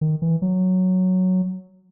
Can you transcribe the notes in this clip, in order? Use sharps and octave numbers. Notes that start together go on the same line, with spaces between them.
D#3
E3
F#3